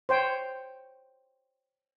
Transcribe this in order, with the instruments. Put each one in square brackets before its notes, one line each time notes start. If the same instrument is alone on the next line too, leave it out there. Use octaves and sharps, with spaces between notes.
[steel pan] C5 C#5 G5